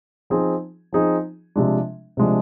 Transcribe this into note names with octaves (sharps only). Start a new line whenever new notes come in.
F3 C4 D#4 G#4
F3 C4 D#4 G#4
C3 F3 G#3 D4
C3 F3 G#3 D4